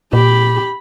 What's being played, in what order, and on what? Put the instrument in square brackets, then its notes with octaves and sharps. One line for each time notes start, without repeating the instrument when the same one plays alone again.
[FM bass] A#2 [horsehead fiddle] G4 B5